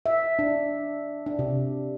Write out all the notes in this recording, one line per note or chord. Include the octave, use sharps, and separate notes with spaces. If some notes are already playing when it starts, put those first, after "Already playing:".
E5
D4
D4
C3